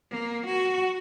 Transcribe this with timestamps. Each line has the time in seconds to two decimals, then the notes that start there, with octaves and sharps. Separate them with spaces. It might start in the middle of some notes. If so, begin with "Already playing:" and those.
0.11 A#3
0.46 F#4